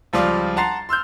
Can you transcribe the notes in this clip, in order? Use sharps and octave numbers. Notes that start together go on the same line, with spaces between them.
C#2 F3 G3 F4 D5 D6
F#5 A5 A#5 C6 A6 C7
C6 E6 F6 G6